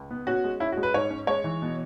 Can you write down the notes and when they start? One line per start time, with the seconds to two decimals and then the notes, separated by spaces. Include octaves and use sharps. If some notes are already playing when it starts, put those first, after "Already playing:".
Already playing: C#2
0.11 B3
0.27 C#4 F#4
0.44 G#3
0.60 C#4 E4
0.72 F#4
0.77 G#3
0.83 B4
0.94 G#2 C#5
1.11 C#4
1.27 G#3 C#5
1.44 E3
1.62 B2